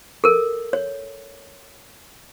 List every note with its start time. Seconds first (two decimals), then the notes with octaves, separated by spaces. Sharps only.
0.24 A4 A#4
0.73 C#5